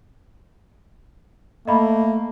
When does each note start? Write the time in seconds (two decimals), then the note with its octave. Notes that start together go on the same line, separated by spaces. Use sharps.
1.68 A3 A#3 D#5 B5